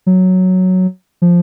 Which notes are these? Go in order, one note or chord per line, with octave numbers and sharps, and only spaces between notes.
F#3
F3